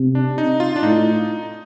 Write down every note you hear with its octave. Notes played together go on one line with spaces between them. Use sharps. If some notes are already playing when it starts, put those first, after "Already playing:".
Already playing: C3
D4
D#4
F4
D4
A2 D#4